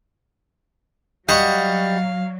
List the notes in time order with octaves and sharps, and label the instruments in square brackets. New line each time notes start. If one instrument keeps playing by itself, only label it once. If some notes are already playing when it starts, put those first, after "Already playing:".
[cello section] F#3 [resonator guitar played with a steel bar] G3 [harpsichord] D#5 F#5 C#6 [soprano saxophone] F5